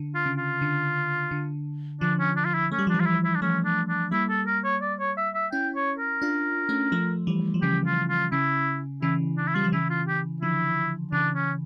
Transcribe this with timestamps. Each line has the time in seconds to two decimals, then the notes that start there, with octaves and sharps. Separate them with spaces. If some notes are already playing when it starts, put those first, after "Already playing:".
Already playing: D3
0.15 F4
0.26 C#3
0.38 F4
0.62 D3
1.31 D3
2.01 D3 F3 D4
2.19 C#4
2.37 D4
2.45 F4
2.54 E4
2.72 A3 C#4
2.79 G3
2.87 F3
2.90 E3 G3 D4
3.00 F4
3.06 E4
3.24 E4
3.35 D4
3.42 F3 A3 C#4
3.65 D4
3.89 D4
4.12 G3 A#3 E4
4.29 A4
4.47 A#4
4.64 C#5
4.82 D5
5.00 C#5
5.17 E5
5.35 E5
5.52 C#4 E4 G5
5.76 C#5
5.99 A#4
6.22 D4 F4
6.69 A3 C#4
6.92 F3 A3
7.27 E3 G3
7.54 F3
7.62 C#3 E3 G4
7.86 F4
8.09 F4
8.32 C#3 E4
9.02 C#3 E3 E4
9.37 D4
9.47 E4
9.55 G3 F4
9.64 F3
9.72 C#3 E3 E4
9.90 F4
10.07 G4
10.42 D3 F3 E4
11.12 C#3 E3 D4
11.35 C#4